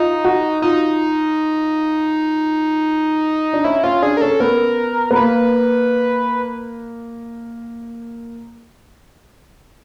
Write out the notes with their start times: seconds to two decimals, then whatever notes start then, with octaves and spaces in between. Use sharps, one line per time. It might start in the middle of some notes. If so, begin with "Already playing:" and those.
Already playing: D#4 F4
0.25 F#4
0.62 D#4 F4
3.53 D4
3.64 C#4 E4
3.83 C#4 F4
4.02 D4 G#4
4.17 A#4
4.21 C#4 A4
4.40 B3 A#4
5.11 B3
5.16 A#3 B4